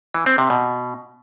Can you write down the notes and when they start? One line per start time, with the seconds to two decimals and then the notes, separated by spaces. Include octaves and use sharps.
0.14 E3
0.26 C4
0.38 C3
0.50 B2